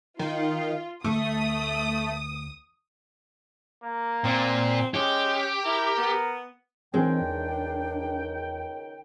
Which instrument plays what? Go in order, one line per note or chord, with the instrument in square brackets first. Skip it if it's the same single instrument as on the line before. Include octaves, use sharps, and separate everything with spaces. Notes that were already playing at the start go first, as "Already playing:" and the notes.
[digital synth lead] D#3 [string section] F4
[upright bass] D2 [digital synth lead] A3 [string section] D#6
[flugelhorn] A#3
[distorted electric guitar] A#2 [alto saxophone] C4
[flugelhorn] G#3 [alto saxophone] C#4 [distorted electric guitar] G4
[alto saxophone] E4 [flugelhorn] A#4
[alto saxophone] B3
[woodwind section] C#2 D#3 G5 [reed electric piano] E3 C4 [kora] G#3 [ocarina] D4
[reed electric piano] E2